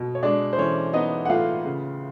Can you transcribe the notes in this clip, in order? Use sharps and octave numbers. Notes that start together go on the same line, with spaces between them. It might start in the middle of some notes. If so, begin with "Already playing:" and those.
Already playing: B2
C#5
G#3 D4 D5
C5
E3 C#4 C#5
B3 D#4 D#5
F#5
A2 F4 F5
C#3